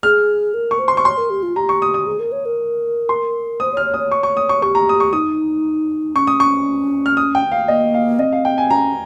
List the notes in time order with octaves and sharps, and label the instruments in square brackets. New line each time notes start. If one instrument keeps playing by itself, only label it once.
[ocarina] G#4 [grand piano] F6
[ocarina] A#4
[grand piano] C#6
[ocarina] C5
[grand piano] C6
C#6
[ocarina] C#5 [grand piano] C6
[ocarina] A#4
G4
F4
[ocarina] G4 [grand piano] A#5
[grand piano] C#6
D#6
D#6
[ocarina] G#4
A#4
C#5
A#4
[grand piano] C6
[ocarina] C5 [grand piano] D#6
[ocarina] C#5
[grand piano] F6
[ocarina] C#5
[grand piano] D#6
[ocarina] C#5
[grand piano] C#6
C#6
D#6
C#6
[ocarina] G4 [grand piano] C#6
[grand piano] A#5
D#6
C#6
[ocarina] D#4 [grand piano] D#6
[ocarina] C#4 [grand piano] C#6
[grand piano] D#6
C#6
F6
D#6
G5
F5
[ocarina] A#3 [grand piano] D#5
[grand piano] F5
[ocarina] C4 [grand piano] D#5
[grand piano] F5
G5
G#5
[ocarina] C#4 [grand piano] A#5